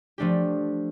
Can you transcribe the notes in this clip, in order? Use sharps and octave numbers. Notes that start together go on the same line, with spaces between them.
F3 A3 D4 G4